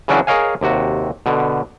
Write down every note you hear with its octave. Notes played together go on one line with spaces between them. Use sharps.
C#3 E3 F#3 C#4 D4 F#4
G#4 A#4 C#5 D#5 F5 G#5
D#2 C3 F#4
B2 D3